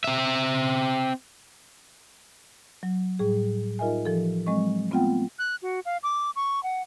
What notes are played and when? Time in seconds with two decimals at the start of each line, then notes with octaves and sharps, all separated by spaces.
0.04 C4 E5
2.83 F#3
3.19 A2 G3 G#4
3.79 D#4 F4 A#4 D#5 E5 G#5
4.05 E3 F3 G4 A4
4.46 F#3 G#3 C4 D#5 C#6
4.91 A3 B3 C4 F4 F#5 G5
5.39 F#6
5.62 F#4
5.85 F5
6.03 D6
6.36 C#6
6.63 F#5